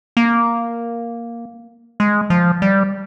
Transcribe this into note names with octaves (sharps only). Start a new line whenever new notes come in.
A#3
G#3
F3
G3